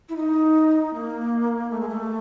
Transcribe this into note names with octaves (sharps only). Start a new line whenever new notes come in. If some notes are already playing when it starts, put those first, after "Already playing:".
E4
D#4
A#3
A3
G#3
A3